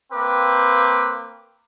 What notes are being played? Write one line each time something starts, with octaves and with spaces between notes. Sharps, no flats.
A#3 C4 B4 D6